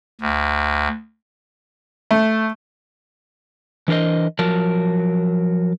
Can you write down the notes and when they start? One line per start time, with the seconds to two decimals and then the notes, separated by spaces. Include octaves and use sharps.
0.21 D2
2.11 A3
3.88 E3 D4 A#4 C5 D#5
4.39 F3 F#3 A#4 A5